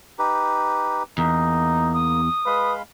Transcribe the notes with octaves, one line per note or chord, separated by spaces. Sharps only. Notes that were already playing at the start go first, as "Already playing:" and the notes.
D#4 G4 B4
E2 A#3 D#4
D#6
G#3 B4 F5 B5